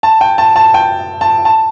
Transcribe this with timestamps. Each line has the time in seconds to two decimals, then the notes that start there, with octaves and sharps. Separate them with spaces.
0.03 A5
0.21 G5
0.38 A5
0.56 A5
0.74 G5
1.21 A5
1.45 A5